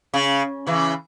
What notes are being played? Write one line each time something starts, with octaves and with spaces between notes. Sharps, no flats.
C#3
C#3 E3